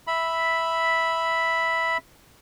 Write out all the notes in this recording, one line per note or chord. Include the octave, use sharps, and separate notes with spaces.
E5 B5